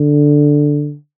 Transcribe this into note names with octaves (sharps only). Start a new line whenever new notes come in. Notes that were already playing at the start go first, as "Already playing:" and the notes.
Already playing: D3